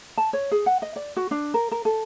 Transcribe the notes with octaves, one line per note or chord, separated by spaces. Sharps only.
A5
C#5
G#4
F#5
D#5
D5
F#4
D4
A#4
A#4
A4